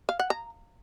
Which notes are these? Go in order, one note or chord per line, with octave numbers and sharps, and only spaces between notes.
F5
F#5
A#5